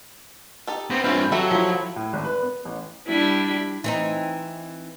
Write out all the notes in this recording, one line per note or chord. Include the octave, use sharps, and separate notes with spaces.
D#4 G4 A4
B3 C4
G2 C4 C#4 E4 F4 B4
F#3 G4 A4 E5
F3 E4
A2
G#1
B4
B3
A1
G3 D4 E4
E3 C4 D#4